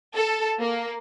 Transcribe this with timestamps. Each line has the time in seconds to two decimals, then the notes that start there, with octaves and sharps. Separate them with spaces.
0.14 A4
0.60 A#3